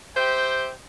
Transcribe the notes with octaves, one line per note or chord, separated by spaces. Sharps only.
G4 C5 E5 G5